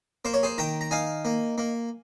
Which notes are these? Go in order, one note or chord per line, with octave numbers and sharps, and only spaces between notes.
A#3 C5
C#5
G#4 C5
D#3 G5 A#5
A#5
D#4 F5 G#5
A#3
A#3